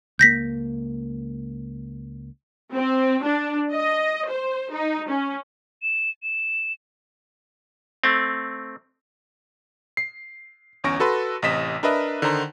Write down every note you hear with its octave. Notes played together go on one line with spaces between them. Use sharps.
C#2 A#3 G6 A#6 B6
C4
D4
D#5
C5
D#4
C#4
E7
E7
A3 C4
C7
G1 E2 C#4 C#6 A#6 D7
F#4 A4 B4 C6
A1 C3 D#5 B6 E7
D4 A#4 B4 D#5 E5
D3 D#3 D#4 C5 A#5